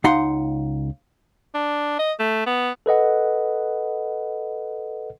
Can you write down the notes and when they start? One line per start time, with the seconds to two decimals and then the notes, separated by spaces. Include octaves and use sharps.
0.04 C#2 D#4 F5 F#5 C6
1.54 D4
1.99 D#5
2.20 A3
2.46 B3
2.86 A4 B4 D#5 F#5